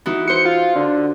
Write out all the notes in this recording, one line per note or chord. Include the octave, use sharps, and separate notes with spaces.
E3 D#4 F#4
F#4 C5 C#7
F4
D3